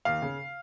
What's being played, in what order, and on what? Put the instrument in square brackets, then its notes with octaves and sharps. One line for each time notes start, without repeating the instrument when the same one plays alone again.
[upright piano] D#2 F5
C#3